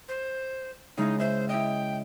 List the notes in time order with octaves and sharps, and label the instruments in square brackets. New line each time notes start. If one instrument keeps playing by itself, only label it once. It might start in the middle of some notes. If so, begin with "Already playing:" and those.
[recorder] C5
[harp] C#3 G#3 E4 [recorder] D#4
[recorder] C5 [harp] E5
[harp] E4 D#5 [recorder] G5